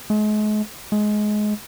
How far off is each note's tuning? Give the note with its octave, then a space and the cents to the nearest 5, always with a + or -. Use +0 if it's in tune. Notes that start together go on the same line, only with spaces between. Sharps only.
G#3 +40
G#3 +20